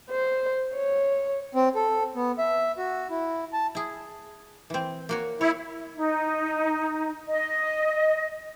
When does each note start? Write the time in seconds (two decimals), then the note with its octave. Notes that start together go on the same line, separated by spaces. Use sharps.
0.10 C5
0.75 C#5
1.53 C4
1.75 A4
2.15 B3
2.38 E5
2.78 F#4
3.10 E4
3.53 A5
3.75 E4 G#4
4.70 E3 C4
5.09 A#3 F#4 C#5
5.41 E4 C#5
5.95 D#4
7.28 D#5